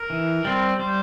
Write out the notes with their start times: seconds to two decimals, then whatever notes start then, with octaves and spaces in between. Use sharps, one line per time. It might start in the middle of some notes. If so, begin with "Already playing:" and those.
Already playing: A#4
0.10 E3
0.45 G3 C4
0.79 G3 C5